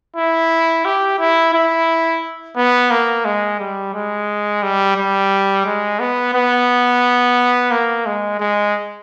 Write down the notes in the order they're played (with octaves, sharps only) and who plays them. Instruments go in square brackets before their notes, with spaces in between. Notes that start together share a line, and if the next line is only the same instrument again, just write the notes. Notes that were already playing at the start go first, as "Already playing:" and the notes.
[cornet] E4
G4
E4
E4
B3
A#3
G#3
G3
G#3
G3
G3
G#3
B3
B3
A#3
G#3
G#3